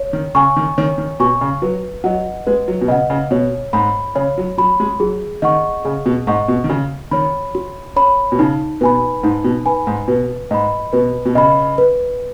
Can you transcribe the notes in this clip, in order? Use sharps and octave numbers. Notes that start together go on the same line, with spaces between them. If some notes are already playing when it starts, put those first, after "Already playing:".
Already playing: C#5
D#3
C#3 G#5 C#6
D#3
D#3 C#5
D#3
B2 G#5 C#6
C#3
F#3 B4
F#3 D#5 F#5
G#3 B4
F#3
B2
C#3 D#5 F#5
C#3
B2 C#5
G#2 B5
C#3 C#5
F#3
F#3 B5
G#3
F#3 G#4
D#3 D#5 F#5 C#6
C#3 G#4
B2
G#2 D#5 F#5 C#6
B2
D#3
C#3 F#4
D#3 C#5 B5
F#4
C#5 B5
B2
C#3 D#4
B2 B4 G#5 B5
G#2 D#4
B2
B4 G#5 B5
G#2
B2 B4
G#2 D#5 B5
B2 B4
B2
C#3 D#5 B5
B4